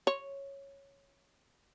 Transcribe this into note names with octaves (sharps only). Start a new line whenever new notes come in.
C#5